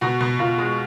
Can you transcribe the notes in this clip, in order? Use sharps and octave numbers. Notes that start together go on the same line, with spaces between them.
B2 F#4
B2
B2 F4
G#3